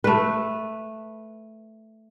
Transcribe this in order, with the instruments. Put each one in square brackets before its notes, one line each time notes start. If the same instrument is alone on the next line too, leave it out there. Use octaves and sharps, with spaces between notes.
[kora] A3 B4